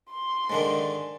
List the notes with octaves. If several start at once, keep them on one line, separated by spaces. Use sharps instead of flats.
C6
G#2 D3 D#3